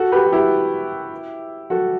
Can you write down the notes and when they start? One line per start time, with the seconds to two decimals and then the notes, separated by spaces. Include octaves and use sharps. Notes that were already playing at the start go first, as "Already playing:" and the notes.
Already playing: F#4 A4
0.12 G4 B4
0.27 F#4
0.32 E4 G4
1.70 F#4 A4